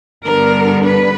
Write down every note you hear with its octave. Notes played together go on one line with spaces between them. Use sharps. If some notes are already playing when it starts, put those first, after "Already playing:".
G2 D3 G3 B3 D4 A#4
B4